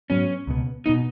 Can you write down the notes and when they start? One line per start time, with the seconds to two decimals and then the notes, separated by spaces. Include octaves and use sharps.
0.10 G#2 F#3 B3 C#4
0.47 C#2 B2 B3
0.86 B2 B3 D#4